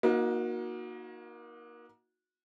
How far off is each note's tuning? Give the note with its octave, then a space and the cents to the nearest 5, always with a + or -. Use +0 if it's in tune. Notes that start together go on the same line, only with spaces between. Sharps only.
A#3 +25 D#4 +20 F#4 -20